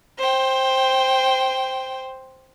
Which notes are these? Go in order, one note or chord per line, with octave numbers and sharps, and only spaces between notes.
C5 G5